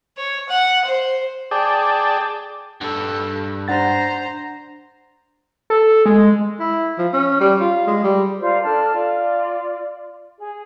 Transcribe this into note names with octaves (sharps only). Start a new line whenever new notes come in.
C#5
F#5
C5
G#4 D5 G5 A5
G2 A4
D4 C5 F#5 A#5 A6
A4
G#3
E4
F3
C#4
G3
F4
G#3
G3
F4 A#4 C5 D5
D4 A4 A5 F6
F4 D5
G#4